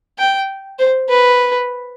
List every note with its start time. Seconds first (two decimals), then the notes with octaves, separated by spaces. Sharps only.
0.18 G5
0.79 C5
1.09 B4